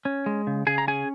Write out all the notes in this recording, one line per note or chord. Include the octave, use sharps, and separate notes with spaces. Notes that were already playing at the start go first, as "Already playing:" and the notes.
C#4
G#3
C#3
C#3 G#4 G#5
A#5
C#4 G#4 G#5